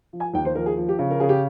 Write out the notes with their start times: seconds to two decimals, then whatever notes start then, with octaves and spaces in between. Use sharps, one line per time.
0.13 F3
0.20 G#5
0.34 D#2 G5
0.45 C5
0.55 F3 A#4
0.66 G#4
0.77 F3
0.89 G4
0.99 C#3
1.11 A#4
1.20 C#3 G#4
1.29 G4